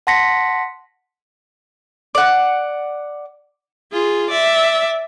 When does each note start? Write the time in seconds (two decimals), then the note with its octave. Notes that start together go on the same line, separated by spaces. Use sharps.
0.07 F#5 A5 C6 A#6 B6 C#7
2.15 D5 F#5
3.92 F4 G#4
4.30 D5 E5